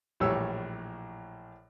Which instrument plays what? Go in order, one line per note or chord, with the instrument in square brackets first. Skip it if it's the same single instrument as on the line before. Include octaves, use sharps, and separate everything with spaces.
[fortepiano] A#1 A2 E3 G3 C#5 E6